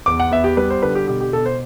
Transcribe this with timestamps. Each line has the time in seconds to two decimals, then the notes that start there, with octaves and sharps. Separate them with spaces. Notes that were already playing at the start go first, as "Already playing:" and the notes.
0.06 E2 D6
0.20 F#5
0.31 B3 E5
0.44 G4
0.57 G3 B4
0.70 C5
0.82 D3 B4
0.95 G4
1.08 B2 G4
1.21 G4
1.33 B2 A4
1.46 C5